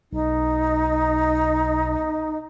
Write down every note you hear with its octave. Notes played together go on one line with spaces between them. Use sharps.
B1 D#4